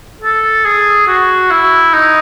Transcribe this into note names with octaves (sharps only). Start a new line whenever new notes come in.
A4
G#4
F#4
E4
D#4